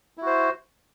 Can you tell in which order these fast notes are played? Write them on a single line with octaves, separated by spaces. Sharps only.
E4 F#4 C5